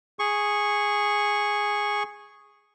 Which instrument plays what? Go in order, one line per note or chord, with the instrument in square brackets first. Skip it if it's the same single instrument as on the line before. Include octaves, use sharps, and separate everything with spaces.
[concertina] G#4 C#6